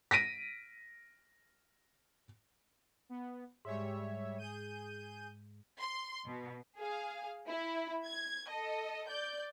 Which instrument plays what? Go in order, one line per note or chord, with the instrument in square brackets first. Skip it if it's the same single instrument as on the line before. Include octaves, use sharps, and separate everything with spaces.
[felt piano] A#6 B6 D7 D#7
[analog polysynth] B3
[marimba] G#2 G#3 [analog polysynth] G3 C#5 E5
[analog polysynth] G#4 G6 D#7
[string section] C6
B2
G#4 F5
E4
G#6
A4 D#5
D5 G6